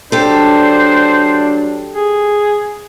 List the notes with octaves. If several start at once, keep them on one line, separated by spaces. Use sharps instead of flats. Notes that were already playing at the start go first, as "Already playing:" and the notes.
F#3 A3 D4 G4 A4 C5
G#4